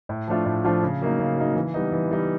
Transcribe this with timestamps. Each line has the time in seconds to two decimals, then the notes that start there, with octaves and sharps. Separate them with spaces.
0.09 A2
0.28 F3 A3 D4 F4
0.46 A2
0.65 F3 A3 D4 F4
0.83 C#3
1.01 F#3 A#3 D#4
1.19 C#3
1.37 F#3 A#3 D#4
1.55 E3
1.74 G3 B3 D#4
1.92 E3
2.11 G3 B3 D#4